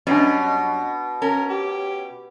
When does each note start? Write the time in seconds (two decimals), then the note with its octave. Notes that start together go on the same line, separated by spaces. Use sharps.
0.07 F#2 B2 G3 C#4 D4 D#5
1.22 C#4 A#4
1.49 G4